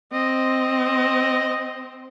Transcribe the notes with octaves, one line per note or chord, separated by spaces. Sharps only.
C4 D#5